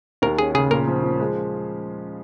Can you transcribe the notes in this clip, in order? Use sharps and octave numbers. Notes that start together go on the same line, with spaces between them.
D#2 A#4
C#4 G#4
C#3 G#4
A#2 A#4
F3
F3
G#3